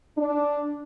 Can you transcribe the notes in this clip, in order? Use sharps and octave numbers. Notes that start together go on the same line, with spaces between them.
D4